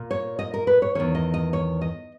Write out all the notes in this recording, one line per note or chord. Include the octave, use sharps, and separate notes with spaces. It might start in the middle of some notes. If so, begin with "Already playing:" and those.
Already playing: A#2
C#5
D#5
A#4
B4
C#5
E2 D#3 C#5
D#5
D#5
C#5
D#5